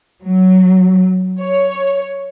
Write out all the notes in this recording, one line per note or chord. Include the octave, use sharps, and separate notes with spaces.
F#3
C#5